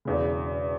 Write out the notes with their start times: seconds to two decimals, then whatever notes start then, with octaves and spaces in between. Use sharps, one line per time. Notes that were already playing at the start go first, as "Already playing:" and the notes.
0.05 E1 E2 C#3